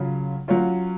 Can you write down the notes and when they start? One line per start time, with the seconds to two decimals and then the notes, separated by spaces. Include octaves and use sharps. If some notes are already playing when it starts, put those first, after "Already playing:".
Already playing: C#3 F#3 C#4 F4
0.48 F#3 C#4 F4